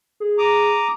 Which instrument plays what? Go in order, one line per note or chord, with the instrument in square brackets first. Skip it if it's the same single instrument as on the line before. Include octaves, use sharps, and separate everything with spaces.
[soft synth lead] G#4
[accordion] A#5 D6 D#6